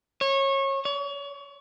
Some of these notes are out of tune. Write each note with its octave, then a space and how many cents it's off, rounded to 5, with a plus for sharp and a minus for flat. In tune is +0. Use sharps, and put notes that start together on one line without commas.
C#5 -25
C#5 +35